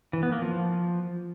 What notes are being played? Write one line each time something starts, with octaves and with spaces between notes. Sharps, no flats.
E3
B3
A#3
F3